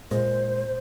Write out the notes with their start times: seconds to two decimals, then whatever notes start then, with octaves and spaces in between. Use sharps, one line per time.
0.11 A#2 G#3 C5